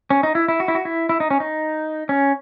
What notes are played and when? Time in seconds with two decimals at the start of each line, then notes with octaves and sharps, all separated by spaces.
0.10 C#4
0.23 D#4
0.35 E4
0.48 E4
0.60 F#4
0.68 E4
0.75 F#4
0.85 E4
1.09 E4
1.20 D#4
1.30 C#4
1.40 D#4
2.09 C#4